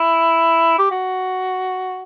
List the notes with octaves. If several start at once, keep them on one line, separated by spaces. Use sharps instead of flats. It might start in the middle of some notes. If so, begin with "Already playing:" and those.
Already playing: E4
G4
F#4